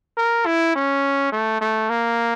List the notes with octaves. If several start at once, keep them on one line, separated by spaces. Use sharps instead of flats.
A#4
E4
C#4
A3
A3
A#3